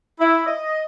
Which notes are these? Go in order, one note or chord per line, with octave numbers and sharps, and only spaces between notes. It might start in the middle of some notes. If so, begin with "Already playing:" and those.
E4
D#5